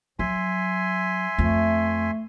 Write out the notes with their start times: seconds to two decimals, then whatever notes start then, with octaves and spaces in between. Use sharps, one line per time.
0.19 F#3 E5 G#5 C6
1.38 F2 A3